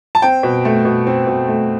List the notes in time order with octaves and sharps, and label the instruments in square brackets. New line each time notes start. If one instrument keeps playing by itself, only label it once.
[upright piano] A5
C4 G5
B2
A3
B2
C4
B2
A3